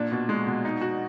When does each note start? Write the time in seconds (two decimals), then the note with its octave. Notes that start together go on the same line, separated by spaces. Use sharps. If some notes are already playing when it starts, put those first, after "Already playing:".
Already playing: A#2 D4
0.12 B2
0.29 G#3
0.47 B2
0.65 D#4
0.81 F#4